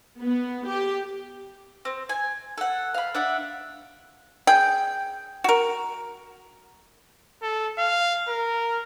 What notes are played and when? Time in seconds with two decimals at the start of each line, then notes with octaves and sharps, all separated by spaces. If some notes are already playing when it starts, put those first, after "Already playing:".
0.22 B3
0.68 G4
1.85 C4
2.09 G#5
2.58 A4 F#5
2.94 F5 B5
3.14 D4 E5 F#5
4.47 G#4 G5
5.44 F#4 A#4
7.42 A4
7.78 F5
8.29 A#4